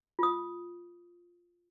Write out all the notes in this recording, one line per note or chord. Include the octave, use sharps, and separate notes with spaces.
F4 D#6